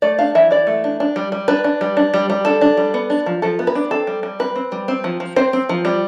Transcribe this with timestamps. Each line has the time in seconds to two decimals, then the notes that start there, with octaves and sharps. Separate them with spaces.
0.02 A3 D5
0.19 D4 F5
0.35 E3 E5
0.51 E3 D5
0.67 A3
0.84 D4
1.00 D4
1.16 G3
1.32 G3
1.48 D4 B4
1.64 D4
1.81 G3
1.97 D4
2.14 G3
2.30 G3
2.45 D4 A4
2.61 D4
2.77 G3
2.94 B3
3.10 D4
3.26 F3
3.42 F3 A4
3.59 B3
3.67 B4
3.75 D4
3.91 C4 A4
4.07 G3
4.23 G3
4.39 C4 B4
4.56 C4
4.72 G3
4.88 C4
5.04 F3
5.20 F3
5.36 C4 C5
5.53 C4
5.69 F3
5.85 G3